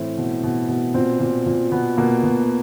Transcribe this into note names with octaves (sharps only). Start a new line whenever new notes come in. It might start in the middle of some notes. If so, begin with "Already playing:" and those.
Already playing: A2 E3 C4
B2
B2
B2
A#2 C4
A#2
A#2
B2 B3
B2 A#3
B2 B3